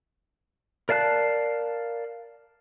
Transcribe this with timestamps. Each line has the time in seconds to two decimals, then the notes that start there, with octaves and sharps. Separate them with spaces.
0.89 A#4 D5 F5 A5 F#6